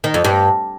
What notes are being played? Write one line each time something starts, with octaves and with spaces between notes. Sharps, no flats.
D#3
F2
G2